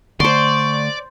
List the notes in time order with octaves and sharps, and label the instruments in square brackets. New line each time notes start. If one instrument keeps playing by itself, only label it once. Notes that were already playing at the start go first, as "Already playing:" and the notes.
[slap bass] D3 A3 [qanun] C5 C6 [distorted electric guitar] D5 [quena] C#6